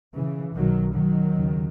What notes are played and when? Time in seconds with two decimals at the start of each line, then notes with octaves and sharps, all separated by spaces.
0.16 C#3 E3
0.55 B1 B2 D#3 F#3
0.94 D#3 F#3
1.34 D#2 C#3